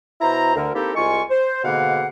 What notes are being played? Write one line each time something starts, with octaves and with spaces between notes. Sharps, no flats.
B2 E4 C5 A#5
D2 D3 A#4
A#3 C4 D#4 E4 G4 A4
C2 G#3 F4 G#5 C#6
C5
G#2 B2 D3 A#3 F5 F#5